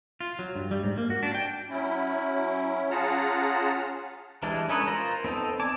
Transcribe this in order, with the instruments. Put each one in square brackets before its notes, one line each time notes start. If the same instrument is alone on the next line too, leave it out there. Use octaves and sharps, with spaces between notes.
[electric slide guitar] F4
F#3
G2
G3
G#2
A#3
F#4
D4
G5
[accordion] F#3 C#4 E4
C#4 F4 G#4 F#5 A5 A#5
[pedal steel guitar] E3 G3 G#3 D4
C#4 D#4 A4 B4 C#5
F4 A#4 C5 A#5
B3 C4 D#4 A4
D5 G#5 A5 D6